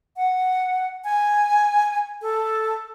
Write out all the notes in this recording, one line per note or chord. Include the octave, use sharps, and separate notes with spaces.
F#5
G#5
A4